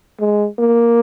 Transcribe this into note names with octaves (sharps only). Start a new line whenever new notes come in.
G#3
A#3